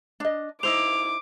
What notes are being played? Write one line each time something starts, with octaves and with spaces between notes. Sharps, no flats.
D4 D#5
D#4 E4 C5 D6 F7